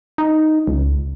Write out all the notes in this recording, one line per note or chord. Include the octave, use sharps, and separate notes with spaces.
D#4
C#2